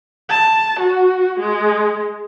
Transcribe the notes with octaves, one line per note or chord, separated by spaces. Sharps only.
A5
F#4
G#3